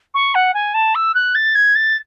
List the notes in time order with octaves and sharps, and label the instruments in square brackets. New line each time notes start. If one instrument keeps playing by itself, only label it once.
[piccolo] C#6
F#5
G#5
A5
E6
F#6
A6
G#6
A6